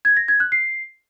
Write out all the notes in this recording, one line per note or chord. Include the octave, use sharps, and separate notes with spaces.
G#6
A#6
G#6
F#6
C7